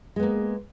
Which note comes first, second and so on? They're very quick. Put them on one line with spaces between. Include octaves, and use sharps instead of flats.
G#3 B3 A#3